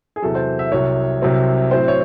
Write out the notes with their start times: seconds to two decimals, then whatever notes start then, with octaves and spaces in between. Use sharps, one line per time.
0.16 G#4
0.22 E2 C3 F#3 A4
0.35 C5
0.59 E5
0.72 C2 C3 F#3 C#5
1.22 C2 C3 F#3 C4
1.71 A2 F#3 C4 C5
1.88 C#5